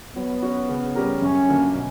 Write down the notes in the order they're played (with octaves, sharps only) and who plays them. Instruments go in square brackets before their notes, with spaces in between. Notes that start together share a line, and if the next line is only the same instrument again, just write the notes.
[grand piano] F#3 [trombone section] B3
[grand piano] C#4 F#4
C#3
G3 C#4 G4 A#4
[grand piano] F#2 [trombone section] C#4
[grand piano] D3 F#3 A#3
B2